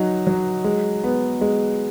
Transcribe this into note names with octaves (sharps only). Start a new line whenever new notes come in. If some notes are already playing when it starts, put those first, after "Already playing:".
Already playing: F#3 D#4
F#3
G#3
B3
G#3